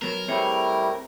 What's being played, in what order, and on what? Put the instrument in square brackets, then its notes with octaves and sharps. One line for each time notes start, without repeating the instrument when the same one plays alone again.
[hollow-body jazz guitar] F#3 B3 [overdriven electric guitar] A#4
[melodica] G3 A3 E4 [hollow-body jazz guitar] C4 G#4 C#5